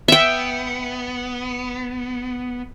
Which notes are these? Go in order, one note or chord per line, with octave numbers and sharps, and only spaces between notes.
B3 E5 G5